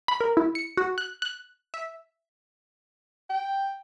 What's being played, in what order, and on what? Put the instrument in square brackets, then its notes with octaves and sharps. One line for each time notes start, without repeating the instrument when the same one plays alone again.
[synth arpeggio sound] B5
A#4
E4
C#7
F#4
F#6
F#6
E5
[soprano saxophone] G5